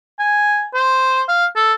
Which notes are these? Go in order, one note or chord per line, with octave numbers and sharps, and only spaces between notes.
G#5
C5
F5
A4